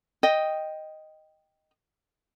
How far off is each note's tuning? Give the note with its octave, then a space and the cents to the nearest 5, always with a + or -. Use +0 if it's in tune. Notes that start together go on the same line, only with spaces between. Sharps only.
D#5 +0 G5 +0